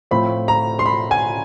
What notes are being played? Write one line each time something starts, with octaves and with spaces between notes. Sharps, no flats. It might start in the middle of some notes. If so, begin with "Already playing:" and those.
A2 F3 A3 C4 B5
A#5
C6
B5
G#5